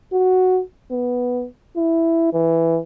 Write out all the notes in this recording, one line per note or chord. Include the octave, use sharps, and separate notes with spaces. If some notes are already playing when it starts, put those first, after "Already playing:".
F#4
B3
E4
E3